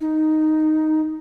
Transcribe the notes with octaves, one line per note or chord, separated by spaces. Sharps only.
D#4